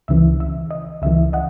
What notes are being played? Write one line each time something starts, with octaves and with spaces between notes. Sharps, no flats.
C#2 C#3 E3 E5
E5
D#5
C#2 C#3 E3 E5
D#5 F#5